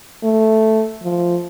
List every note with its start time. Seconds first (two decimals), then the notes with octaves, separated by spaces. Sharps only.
0.24 A3
1.03 F3